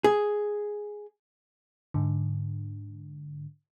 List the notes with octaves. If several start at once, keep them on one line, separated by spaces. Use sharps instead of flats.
G#4
G#2 D3